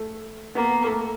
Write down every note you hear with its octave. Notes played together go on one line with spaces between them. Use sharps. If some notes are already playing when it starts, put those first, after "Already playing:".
Already playing: A3
A#3 B3
A3